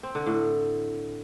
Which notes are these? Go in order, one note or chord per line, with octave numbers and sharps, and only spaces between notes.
C4
D3
A2